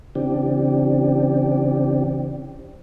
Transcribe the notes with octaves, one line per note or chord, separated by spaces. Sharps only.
C#3 E3 C4 D4 G4